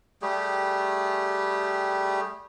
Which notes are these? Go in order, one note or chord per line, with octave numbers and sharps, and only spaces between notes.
G3 A3 G4 G#4